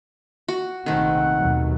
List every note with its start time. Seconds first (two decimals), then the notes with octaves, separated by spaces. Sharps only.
0.48 F#4
0.86 A#1 C3 D#3 A3 C4 F#5
1.37 D#2 B2 F#3